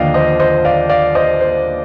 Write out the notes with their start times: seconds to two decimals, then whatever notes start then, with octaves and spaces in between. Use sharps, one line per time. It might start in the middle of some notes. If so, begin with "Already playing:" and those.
Already playing: D#2 D3 F3 D5 D#5 F5 G5
0.14 C5 D#5
0.40 C5 D#5
0.65 D5 F5
0.90 D5 F5
1.15 C5 D#5
1.40 C5